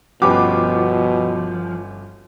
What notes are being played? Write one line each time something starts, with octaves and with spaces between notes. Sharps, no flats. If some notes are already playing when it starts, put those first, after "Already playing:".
G1 B2 F3 C#4 F#4 G4 B4 D6